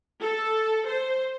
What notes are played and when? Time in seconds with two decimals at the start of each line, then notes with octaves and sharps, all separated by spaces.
0.21 A4
0.87 C5